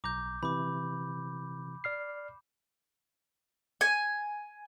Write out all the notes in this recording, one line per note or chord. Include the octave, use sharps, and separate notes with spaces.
B1 A#5 D6 G6
C3 E3 B5 D6
D5 F6 C7
G#5